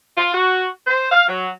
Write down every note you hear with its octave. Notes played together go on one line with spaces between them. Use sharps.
F4
F#4
C5
F5
F#3